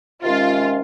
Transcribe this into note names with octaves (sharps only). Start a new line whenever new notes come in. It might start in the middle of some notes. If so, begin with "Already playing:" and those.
C3 D#3 G#3 C#4 F4